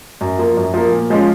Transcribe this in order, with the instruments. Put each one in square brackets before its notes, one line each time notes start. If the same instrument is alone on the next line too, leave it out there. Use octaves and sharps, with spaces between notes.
[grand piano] F#2
F3 A#3
F#2
F3 A#3
A#2
F3 G#3 C#4 F4